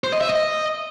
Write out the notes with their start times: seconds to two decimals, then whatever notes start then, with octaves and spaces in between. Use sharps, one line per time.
0.04 C5
0.12 D#5
0.21 E5
0.30 D#5